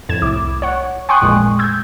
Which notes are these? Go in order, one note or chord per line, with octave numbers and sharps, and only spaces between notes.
F2 A2 G#6 E7
C2 A2 E4 D6
C#5 F#5
G5 G#5 C6 C#6 D#6 F#6
A1 F2 A#2 G#3
E6 G6 G#6